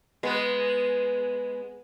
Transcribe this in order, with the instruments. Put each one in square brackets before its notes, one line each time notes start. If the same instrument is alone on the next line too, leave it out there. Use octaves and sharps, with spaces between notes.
[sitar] G#3 B3